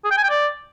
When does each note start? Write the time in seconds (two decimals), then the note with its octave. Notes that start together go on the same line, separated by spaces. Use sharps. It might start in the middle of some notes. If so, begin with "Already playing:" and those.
0.04 G#4
0.11 G5
0.17 G#5
0.23 G5
0.30 D5